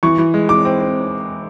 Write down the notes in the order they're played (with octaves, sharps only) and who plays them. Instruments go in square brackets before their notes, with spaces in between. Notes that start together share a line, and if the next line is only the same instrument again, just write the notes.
[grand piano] E3 [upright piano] C#6
[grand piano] E3
G#3
[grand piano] E3 [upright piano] D6
[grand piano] C4
C4